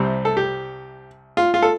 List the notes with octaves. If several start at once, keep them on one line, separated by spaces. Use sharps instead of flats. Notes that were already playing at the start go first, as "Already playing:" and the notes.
Already playing: C2 C3 G3 C4
A4
G4
F4
F4
A4